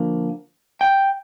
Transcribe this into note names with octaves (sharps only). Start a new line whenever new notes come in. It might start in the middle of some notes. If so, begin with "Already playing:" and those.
Already playing: D3 F3 A#3
G5